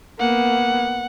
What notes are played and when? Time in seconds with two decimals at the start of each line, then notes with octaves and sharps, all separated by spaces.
0.20 A#3 B3 F#5